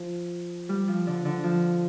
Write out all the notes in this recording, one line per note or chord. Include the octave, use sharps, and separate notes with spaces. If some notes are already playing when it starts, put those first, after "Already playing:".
Already playing: F3
G3
F3
D3
D3
F3